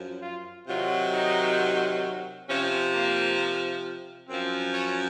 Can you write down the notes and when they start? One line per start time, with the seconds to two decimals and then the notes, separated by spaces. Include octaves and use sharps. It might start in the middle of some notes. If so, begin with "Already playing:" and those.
Already playing: F#2 F3
0.22 F4
0.67 C3 D#3 F#3 F4
1.12 D#4
2.47 C3 F3 C#4
2.92 A#3
4.28 F#2 F3 C4
4.74 C#4